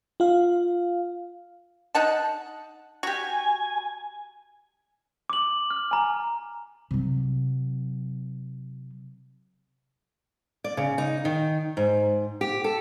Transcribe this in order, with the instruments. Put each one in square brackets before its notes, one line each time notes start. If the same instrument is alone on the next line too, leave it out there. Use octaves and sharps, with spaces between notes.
[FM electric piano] F4 F5
[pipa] D#4 F#5 A5
[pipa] F#4 G4 [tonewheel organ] G#5
[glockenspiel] D6 F#7
F6
G#5 A#5
[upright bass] C3 F#3
[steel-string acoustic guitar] D5
C#3
D#4
D#3
G#2
G4
A4